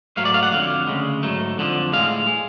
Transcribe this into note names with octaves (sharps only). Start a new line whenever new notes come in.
G#2 F#3 A3 F5
D5
F5
F#5
F2 D3 F#3 F5
D2 C#3 G#3
G#2 F#3 A3
F2 D3 F3
A2 G#3 F5
G#3